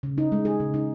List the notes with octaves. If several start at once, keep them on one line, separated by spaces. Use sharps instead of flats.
C#3
D#4
G#3
G#4
C#3
D#4